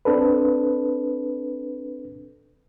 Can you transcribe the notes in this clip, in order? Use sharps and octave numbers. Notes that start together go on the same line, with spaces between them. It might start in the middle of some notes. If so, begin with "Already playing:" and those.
C4 D4 A4 B4